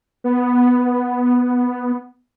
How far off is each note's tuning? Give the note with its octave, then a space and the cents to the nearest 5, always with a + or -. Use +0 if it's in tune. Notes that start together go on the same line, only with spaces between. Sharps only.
B3 +0